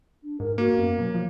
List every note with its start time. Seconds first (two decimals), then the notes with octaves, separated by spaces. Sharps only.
0.23 D4
0.40 G#2 A#4
0.58 A#3 F#4
0.78 F#2 B3
0.99 B2 F#3
1.14 F3